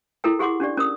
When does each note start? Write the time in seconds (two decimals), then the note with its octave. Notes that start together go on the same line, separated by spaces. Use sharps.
0.24 E4 A4 A#4 G5
0.39 G4 G#4 F#5 C6 D6
0.60 C#4 D4 G4 D5
0.77 C#4 A#4 D#6